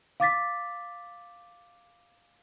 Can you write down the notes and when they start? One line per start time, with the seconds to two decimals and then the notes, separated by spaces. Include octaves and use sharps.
0.20 F5 D6 A6 B6